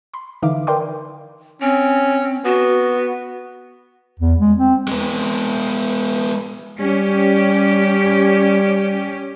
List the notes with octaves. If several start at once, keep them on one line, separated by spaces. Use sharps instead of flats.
B5 C6
D3 E3 D#4 E5 F5 D6
A#4 B4 D5 G5 C6 D6
C4 C#4
B3 F#4
E2
G#3
C4
G#3 B3
G3 C#4 G4